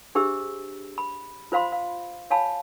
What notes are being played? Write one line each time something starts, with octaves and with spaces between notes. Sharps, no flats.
D4 G4 G#4 C5 E5 E6
B5
F4 C5 F5 B5 C6
F5
C#5 F5 G#5 A5 B5